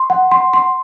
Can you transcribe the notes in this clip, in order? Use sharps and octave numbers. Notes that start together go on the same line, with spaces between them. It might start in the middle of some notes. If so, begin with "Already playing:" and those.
Already playing: C6
F#5
C6
C6